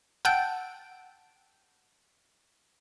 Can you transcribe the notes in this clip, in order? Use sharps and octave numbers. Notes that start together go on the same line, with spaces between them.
F#5 G5 A5 E6 G6 D7